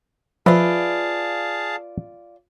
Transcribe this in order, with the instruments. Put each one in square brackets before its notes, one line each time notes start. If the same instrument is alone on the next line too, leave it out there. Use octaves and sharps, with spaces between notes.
[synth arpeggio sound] F3 [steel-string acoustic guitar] F4 D5 [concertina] G#4 F5 A5 [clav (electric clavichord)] B4 E5